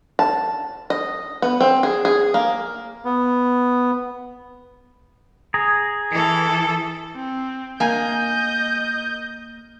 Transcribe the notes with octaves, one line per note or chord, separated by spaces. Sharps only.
A5
D#5
B3
C4
G#4
G#4
A#3
B3
G#4 A#5
E3 A4
C4
A#3 D#5 G#5 G6